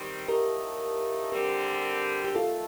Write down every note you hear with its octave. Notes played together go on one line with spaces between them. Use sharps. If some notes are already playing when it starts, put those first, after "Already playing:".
Already playing: D#3 G3 C4
A2 F3 A3 D#4 G4 A#4
D3 G3 C4 G4 A#4
G4
D#3 A3 F4 A4